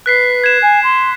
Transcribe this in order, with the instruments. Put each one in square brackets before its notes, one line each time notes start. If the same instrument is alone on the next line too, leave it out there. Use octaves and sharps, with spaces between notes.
[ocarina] B4 [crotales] F#6 B6 C7
[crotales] G#6 E7
[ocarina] G#5
C6